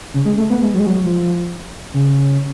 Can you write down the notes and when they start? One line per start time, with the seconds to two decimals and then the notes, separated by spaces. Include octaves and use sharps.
0.14 C#3
0.25 G#3
0.37 A3
0.50 B3
0.62 G#3
0.74 F#3
0.79 G#3
0.87 F#3
1.04 F3
1.94 C#3